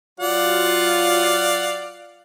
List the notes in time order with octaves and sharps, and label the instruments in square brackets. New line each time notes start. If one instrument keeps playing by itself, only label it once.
[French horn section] F#3 F4 [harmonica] D5 F5 F#5